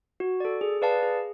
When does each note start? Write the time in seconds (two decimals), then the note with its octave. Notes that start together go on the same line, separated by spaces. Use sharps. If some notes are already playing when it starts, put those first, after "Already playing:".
0.20 F#4
0.40 A4 D5
0.61 G#4
0.82 B4 D5 F5 A5
1.02 G#4